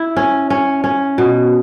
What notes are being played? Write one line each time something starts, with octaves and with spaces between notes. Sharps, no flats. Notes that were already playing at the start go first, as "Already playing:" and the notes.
Already playing: E4
C#4
C#4
C#4
B2